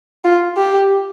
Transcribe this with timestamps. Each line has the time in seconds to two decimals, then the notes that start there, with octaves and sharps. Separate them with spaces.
0.24 F4
0.57 G4